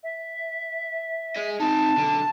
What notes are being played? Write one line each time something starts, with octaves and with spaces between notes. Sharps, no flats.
E5
G#4 D#5
C4 D#4 A5
B1 D3